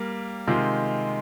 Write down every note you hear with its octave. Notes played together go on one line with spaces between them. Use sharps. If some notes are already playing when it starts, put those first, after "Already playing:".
Already playing: G3 A#3
C3 D#3 G#3 C4 F4